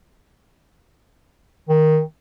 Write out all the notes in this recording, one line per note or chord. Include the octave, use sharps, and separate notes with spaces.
D#3